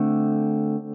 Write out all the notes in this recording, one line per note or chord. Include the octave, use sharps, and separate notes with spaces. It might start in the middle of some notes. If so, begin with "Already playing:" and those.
Already playing: D3 A3 C4